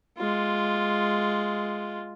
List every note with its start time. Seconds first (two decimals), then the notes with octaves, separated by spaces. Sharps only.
0.18 G#3 F4